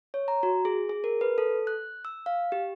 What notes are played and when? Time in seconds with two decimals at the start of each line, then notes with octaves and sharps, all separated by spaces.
0.14 C#5
0.28 A#5
0.43 F#4
0.65 G#4
0.89 G#4
1.04 A#4
1.21 B4
1.38 A4
1.67 F#6
2.05 E6
2.26 F5
2.52 G4